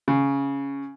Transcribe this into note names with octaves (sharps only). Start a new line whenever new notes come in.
C#3